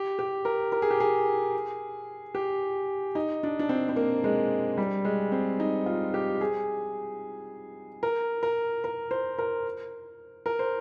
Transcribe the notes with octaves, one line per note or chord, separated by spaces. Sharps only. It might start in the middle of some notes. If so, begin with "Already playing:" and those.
Already playing: G4
G4
A#4
A#4
G#4
G4
G#4
G4
D#4
D4
D4
C4
C4
A#3
G#3
G3
G#3
C4
D#4
F4
G4
G#4
A#4
A#4
A#4
C5
A#4
A#4
C5